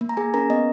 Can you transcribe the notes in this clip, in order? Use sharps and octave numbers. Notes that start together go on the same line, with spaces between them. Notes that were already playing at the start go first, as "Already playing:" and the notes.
A#3
A#5
A#3 G#4 G#5
C#4 A#4 A#5
B3 D#5